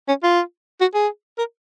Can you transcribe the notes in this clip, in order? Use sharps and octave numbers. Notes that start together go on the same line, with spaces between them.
C#4
F4
F#4
G#4
A#4